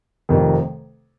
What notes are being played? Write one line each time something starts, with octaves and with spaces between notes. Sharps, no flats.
F1 F2 C3 D#3